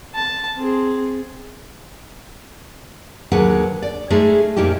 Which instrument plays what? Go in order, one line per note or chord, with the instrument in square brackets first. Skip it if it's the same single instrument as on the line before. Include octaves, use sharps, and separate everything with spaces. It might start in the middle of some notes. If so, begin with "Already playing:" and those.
[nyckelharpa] A5
C4 G#4
[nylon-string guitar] D#2 D3 F#3 G#4 B4 F#5
D5
G#3 A3 C#4 D#4 G#4 A4
F2 A#2 D#4 E4 G4